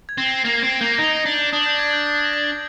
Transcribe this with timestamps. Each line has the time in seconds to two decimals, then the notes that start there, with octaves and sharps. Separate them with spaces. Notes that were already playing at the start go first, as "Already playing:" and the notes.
0.09 G#6
0.18 C4
0.27 A#6
0.45 A#3 C7
0.63 C4 D7
0.81 A#3 G6
0.99 D#4
1.17 A#6
1.26 D4
1.35 G6
1.52 D4 D#6
1.66 G6
1.79 G#6
1.93 G6
2.07 G6
2.25 A#6
2.33 G#6